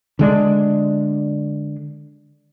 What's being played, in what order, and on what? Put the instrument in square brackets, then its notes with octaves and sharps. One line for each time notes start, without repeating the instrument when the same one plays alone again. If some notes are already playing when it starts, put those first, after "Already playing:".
[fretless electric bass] D3 G#3 D4